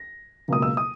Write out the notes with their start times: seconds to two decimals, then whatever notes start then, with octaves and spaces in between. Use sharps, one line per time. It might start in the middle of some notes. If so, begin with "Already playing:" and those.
Already playing: A#6
0.48 C#2 B2 F#3 A#3 D#6
0.62 E6
0.77 D#6